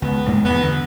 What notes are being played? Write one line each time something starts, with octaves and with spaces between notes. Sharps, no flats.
C#2 B3
E1 G#2 A#3
E2 G2 B3
G2 D3